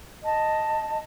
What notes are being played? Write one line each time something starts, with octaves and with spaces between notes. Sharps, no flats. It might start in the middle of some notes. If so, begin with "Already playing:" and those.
D#5 A5